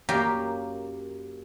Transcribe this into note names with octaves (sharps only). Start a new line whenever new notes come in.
F#2 A#3 G4 F5